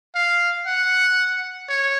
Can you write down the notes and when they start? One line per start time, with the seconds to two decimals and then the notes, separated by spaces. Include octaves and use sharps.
0.15 F5
0.66 F#5
1.69 C#5